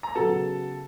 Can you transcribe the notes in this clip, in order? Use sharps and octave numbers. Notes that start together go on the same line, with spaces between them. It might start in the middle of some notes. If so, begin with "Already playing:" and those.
A#5
C#3 F#3 B3 A4 A5